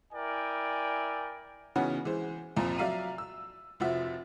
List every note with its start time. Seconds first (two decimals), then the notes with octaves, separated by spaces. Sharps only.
0.13 E4 A#4 D5 E5 G5 G#5
1.76 C#3 E3 B3 C#4 D#4 F#4
2.05 E3 G#3 C5
2.56 C2 F2 A#2 F3 A#5
2.78 F#3 D5 E5 F5 A#5 D#7
3.18 E6
3.80 F1 F3 F#4 E5